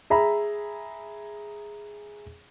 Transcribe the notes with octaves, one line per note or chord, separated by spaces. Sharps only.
G#4 E5 A#5 B5